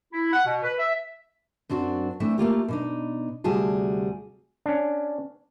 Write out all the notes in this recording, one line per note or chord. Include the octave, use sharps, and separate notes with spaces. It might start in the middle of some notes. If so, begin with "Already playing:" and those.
E4
F#5
B2
B4
E5
F#2 C4 D4 F#4
E3 A3 C4 D4 E5
A3 A#3 F4 G4
B2 D4 D#4
D2 C3 G3 F#4 G#4 A5
C#4 D4